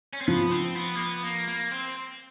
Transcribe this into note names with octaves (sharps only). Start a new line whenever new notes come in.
C#4
C4
F3 B3
C4
B3
A#3
B3
A#3
A#3
C4